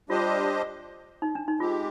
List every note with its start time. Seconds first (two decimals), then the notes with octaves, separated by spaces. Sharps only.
0.09 G3 D4 F4 G4 C5 D#5
1.22 D#4
1.35 D4
1.48 D#4
1.60 G#3 C4 F4 G4